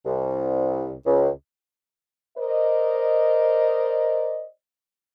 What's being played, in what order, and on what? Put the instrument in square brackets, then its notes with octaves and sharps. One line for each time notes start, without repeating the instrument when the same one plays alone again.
[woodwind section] C2
C#2
[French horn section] A#4 C5 D5 D#5